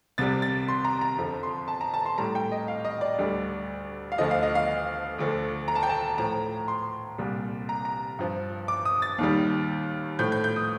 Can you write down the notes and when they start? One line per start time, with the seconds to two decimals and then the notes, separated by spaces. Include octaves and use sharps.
0.18 C2 C3 G3 A6
0.42 A6
0.68 C6
0.85 A#5
1.01 A#5
1.18 F2 D3 F3
1.43 C6
1.68 A5
1.81 A#5
1.94 A5
2.06 C6
2.18 A2 G3 A#5
2.35 G5
2.52 D#5
2.68 F5
2.85 D#5
3.01 D5
3.18 D2 D3 G3
4.12 F5
4.18 D2 D3 F3 D#5
4.31 F5
4.43 D#5
4.55 F5
5.19 D2 D3 F3
5.68 A#5
5.76 A5
5.83 G5
5.90 A5
6.18 A2 F3 A#5
6.68 C6
7.18 C2 A#2 G3
7.69 A#5
7.85 A#5
8.19 G2 F3
8.68 D6
8.85 D#6
9.02 A6
9.18 D#2 D#3 G3
10.19 A2 F3 G6
10.32 G6
10.44 G6
10.56 D#6